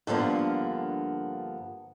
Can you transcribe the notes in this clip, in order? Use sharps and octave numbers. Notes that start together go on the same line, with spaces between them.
G2 D3 F3 A#3 B3